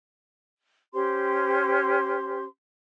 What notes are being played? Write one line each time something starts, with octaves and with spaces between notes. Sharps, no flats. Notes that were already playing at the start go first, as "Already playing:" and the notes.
C#4 G4 C5 C6